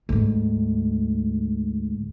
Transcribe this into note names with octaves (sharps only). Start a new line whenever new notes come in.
D2 G#2